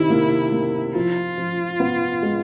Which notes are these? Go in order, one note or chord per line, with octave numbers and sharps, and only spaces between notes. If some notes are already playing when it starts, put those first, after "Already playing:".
Already playing: C3 D#3 E4
A#3
A#3
F3 F4
F3
B3
G#3